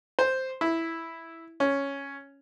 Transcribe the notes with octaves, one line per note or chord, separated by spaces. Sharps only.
C5
E4
C#4